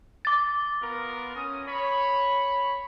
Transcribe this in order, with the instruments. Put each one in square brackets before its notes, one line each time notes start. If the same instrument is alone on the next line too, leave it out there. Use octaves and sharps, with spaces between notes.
[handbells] D6 A6
[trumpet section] B3 F4 A#4
C#4 D#6
C#5 B5